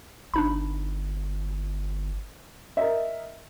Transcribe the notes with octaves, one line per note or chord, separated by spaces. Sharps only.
G1 D4 D#4 B5
A#4 D#5 E5